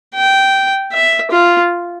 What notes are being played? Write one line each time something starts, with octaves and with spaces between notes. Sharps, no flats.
G5
E5
F4